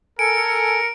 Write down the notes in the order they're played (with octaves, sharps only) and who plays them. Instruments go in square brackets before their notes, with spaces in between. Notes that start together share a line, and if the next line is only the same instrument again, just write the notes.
[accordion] A4 G#5 [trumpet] A#4 [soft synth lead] C#7 [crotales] D7